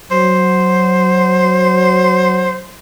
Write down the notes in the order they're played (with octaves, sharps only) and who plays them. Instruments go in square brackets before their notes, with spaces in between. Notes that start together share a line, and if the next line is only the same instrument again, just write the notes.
[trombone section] F#3 [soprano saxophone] C5